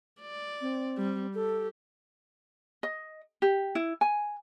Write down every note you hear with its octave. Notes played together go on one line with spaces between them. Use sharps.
D5
C4
G3
G4 A4
D#5
G4
E4
G#5